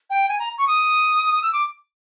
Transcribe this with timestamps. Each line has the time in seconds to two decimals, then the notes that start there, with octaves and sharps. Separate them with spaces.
0.10 G5
0.29 G#5
0.39 A#5
0.58 C#6
0.67 D#6
1.43 E6
1.53 D6